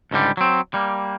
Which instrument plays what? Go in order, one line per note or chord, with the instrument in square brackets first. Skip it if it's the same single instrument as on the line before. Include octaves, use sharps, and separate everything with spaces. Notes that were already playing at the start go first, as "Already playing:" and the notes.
[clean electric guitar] C#2 G#2 D3 G3
F#3 C4
G3 A#3